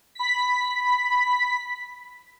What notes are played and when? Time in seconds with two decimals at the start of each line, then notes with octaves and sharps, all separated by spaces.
0.15 B5 B6